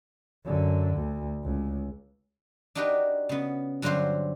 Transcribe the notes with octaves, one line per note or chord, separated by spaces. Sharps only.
F#2 D3
D2
C#2
D4 D#4 F#4 G4 A#4 B4
C#3 B3
G2 D3 F#3 F4 F#4 C5